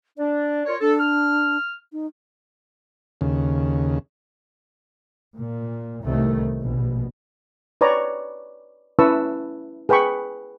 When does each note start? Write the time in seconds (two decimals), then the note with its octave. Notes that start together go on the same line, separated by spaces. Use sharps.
0.18 D4 D5
0.66 F4 A#4 C#5
0.81 D4 A4
0.99 F6
1.92 D#4
3.21 D#2 C#3
5.38 A#2
6.04 C2 A2 D#3 A3
6.62 A#1 B2
7.81 B4 C#5 D5 A#5
8.99 C#4 E4 B4 A5 C#6 E6
9.89 G#4 B4 G5 B5 C#6